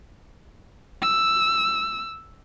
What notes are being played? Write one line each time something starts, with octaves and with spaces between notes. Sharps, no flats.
E6